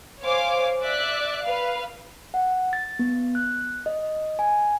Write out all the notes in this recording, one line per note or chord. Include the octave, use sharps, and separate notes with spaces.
C5 C#5 F5 G#5 D6
D5 E5 D6 F#6
B4 F5
F#5
A6
B3
F#6
D#5
G#5